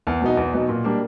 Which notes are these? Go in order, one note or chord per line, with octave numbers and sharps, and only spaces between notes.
E2
B2 F#3 B3 D#4
E2
B2 F#3 B3 D#4
A#2
G3 A#3 D4